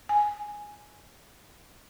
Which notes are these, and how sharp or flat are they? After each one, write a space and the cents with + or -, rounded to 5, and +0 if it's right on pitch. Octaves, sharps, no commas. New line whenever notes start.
G#5 +0